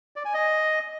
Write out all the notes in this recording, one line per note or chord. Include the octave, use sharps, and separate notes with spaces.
D5
G#5
D#5